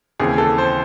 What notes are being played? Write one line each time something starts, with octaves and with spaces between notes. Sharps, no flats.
D#2 C#3 E3 C4 G#4
A4
C5